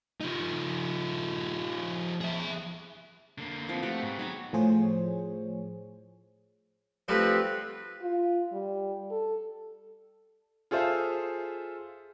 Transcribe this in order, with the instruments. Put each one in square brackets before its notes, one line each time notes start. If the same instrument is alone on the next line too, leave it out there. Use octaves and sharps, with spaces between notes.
[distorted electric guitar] F3 D#4
G#4 E5
[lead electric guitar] D3 A#3
[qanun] F3 B3 C4
[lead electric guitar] A3 [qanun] F#4 G4
[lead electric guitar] G#2
[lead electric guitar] F#3 F#4 [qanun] G#3 B3 D#4
[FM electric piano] A2 F3 G#4 C5 C#5
[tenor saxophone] F3 [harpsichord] G3 A3 F#4 [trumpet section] C4 B4
[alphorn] F4
G3
A4
[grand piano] F4 G#4 A4 C5 E5 F5